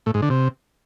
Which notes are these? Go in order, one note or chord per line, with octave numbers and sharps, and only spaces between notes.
A2
G#2
D3
C3